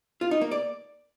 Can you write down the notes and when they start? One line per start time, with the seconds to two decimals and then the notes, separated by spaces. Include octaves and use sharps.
0.21 F4
0.31 D#4
0.41 A#3
0.51 D5